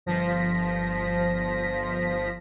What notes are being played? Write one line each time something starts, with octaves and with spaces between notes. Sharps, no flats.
G1 F3 A#6 B6